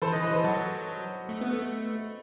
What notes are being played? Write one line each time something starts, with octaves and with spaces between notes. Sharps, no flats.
E3 A4 C5
B4 D#5
E3
B4 D#5
E3 A4 C5
F#3 F#4 A4
A3
B3
A3